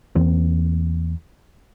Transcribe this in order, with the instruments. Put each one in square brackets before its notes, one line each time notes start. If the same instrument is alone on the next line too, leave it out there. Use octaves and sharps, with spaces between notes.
[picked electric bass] E2 E3 A#3 C4